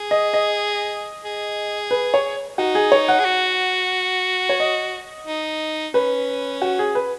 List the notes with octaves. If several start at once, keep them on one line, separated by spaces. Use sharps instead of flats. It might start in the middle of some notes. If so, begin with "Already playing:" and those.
Already playing: G#4
D#5
D#5
G#4
B4
C#5
D#4 F#4
G#4
C#5
F#5
G#4
F#4
C#5
D#5
D#4
C#4 B4
F#4
G#4
B4